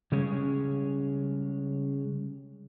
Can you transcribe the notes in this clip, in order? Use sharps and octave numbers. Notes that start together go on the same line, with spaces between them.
C#3 G3 G#3 C#4 G#4 C#5